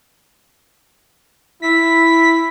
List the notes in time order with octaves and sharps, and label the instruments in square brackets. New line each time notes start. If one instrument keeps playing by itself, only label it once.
[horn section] E4 [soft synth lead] B6